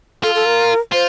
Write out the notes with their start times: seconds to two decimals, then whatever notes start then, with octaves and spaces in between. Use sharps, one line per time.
0.23 F4 A4
0.35 A4
0.46 A#4
0.92 F4 C5